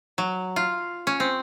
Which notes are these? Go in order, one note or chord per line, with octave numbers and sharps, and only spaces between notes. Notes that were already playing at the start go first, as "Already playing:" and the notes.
F#3
F4
C#4
C4